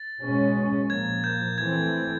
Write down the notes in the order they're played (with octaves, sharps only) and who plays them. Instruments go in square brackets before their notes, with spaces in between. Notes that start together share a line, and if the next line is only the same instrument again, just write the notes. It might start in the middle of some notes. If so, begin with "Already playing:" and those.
Already playing: [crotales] A6
[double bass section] B2 G#3 C#4
[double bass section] A#2 F3 A#3 [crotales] G#6
[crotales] G6
[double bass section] E3 A3 C4 [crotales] G#6